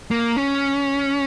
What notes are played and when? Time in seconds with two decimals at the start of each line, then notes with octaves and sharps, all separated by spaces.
0.11 A#3
0.36 C#4